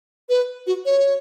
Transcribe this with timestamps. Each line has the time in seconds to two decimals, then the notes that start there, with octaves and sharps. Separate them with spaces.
0.29 B4
0.67 F#4
0.85 C#5